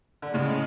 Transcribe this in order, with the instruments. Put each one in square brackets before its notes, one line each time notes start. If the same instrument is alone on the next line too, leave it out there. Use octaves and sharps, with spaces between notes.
[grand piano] D3
[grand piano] A2 C#3 [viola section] G#3 C#4